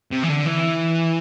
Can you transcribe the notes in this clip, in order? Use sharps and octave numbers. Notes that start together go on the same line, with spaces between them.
C3
E3
D3
E3